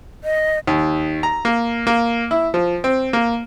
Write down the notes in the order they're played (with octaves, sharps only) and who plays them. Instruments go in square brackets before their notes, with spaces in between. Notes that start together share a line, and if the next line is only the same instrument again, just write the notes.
[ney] D#5
[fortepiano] D#2
A#5
A#3
A#3
E4
F3
C4
A#3